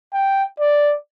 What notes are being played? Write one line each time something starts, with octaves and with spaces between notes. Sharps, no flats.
G5
D5